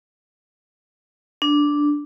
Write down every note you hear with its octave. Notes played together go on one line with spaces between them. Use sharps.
D4